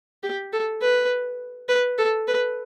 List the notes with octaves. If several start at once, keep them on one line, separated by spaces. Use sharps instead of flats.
G4
A4
B4
B4
A4
B4